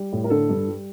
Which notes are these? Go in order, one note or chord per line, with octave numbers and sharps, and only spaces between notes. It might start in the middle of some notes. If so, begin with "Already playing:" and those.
Already playing: G3
A2
A#4
D3 A4
G2
G3